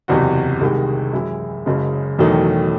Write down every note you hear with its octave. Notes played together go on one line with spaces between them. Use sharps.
F#1 E2 C3 F#4
C2 C3 D#3 G#3
F#2 E3 G#3 E4
F#1 F#2 C#3 G#3
E1 E2 D#3 F#3 A3